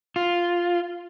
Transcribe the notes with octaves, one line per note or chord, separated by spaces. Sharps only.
F4